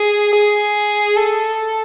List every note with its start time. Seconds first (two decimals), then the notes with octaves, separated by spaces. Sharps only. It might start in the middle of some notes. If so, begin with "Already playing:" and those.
Already playing: G#4
0.33 G#4
1.17 A4